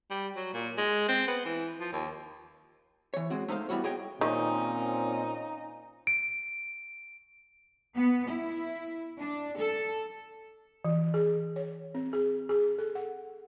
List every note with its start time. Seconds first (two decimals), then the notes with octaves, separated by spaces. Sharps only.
0.11 G3
0.36 F#3
0.54 A#2
0.78 G#3
1.09 C4
1.28 B3
1.46 E3
1.80 F3
1.93 D#2
3.14 E3 C#5
3.30 G#3 C4 F#4
3.48 A3 D#4 C5 F5
3.69 G3 B3 E4 F#4 C#5
3.84 F#4 G#4 C#5 D#5 G5
4.21 A#2 D#3 C4 C#4 D#4
6.07 D7
7.94 B3
8.28 E4
9.17 D4
9.57 A4
10.85 E3
11.14 G#4
11.56 C#5
11.95 C4
12.13 G#4
12.49 G#4
12.78 A4
12.95 F#5